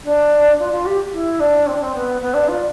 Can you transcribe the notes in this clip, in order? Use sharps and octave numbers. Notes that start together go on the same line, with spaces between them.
D4
F4
F4
G4
E4
D4
C4
D4
C4
B3
B3
D4
F4